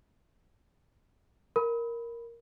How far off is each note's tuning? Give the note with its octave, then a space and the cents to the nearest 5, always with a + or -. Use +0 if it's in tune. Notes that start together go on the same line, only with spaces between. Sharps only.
A#4 +0 B5 +0